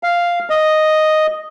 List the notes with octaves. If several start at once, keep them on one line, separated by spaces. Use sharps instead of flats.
F5
D#5